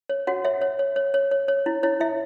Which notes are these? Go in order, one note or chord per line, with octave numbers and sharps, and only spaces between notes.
C#5
F#4 C#5 F#5
C#5 E5
C#5
C#5
C#5
C#5
C#5
C#5
E4
E4 C#5
E4 E5